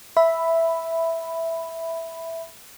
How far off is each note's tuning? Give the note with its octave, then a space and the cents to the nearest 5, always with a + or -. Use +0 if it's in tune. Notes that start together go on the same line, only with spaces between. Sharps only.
E5 +0 B5 +5